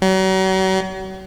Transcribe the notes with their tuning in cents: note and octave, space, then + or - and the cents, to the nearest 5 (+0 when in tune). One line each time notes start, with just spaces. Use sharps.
F#3 +40